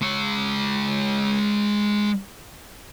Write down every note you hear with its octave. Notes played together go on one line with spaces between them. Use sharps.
G#3 C#5